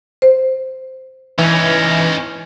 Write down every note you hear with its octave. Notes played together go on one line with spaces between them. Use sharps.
C5
E3 C#4 D#4